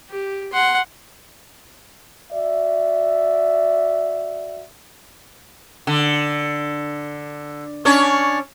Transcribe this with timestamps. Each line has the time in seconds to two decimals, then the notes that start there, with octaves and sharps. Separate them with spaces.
0.10 G4
0.52 F#5 C6
2.32 F#4 D5 E5
5.87 D3
7.85 C#4 D4 C#5